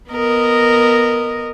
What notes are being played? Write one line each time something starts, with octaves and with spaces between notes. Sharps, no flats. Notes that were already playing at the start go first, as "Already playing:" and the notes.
B3 A#4 D#5